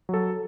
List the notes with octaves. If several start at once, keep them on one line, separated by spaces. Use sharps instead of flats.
F#3 A4